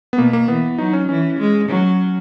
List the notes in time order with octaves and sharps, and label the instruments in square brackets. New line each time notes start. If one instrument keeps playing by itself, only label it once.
[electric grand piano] B3
[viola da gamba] B2 [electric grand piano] A#3
[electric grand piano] A#3
[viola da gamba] E3 [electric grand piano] B3
[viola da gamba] F#3 [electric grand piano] D#4
[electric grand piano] C#4
[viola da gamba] E3 [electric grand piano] C#4
[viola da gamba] G#3
[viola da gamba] F#3 [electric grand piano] C#4